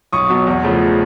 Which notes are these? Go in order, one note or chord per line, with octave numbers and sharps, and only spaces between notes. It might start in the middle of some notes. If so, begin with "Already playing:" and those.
B1 C#6 D#6
B2 F#3
E2
C#3 F3 A3